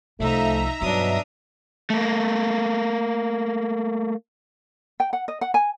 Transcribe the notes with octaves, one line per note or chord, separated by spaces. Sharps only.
C2 F3 A3 D#4 E5 A#5
G2 B2 F#3 D4 D#6
A3 A#3
G5
F#5
D#5
F#5
G#5